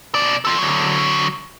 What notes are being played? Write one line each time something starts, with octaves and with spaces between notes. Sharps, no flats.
B2 D5
F4 A4
D3 F#3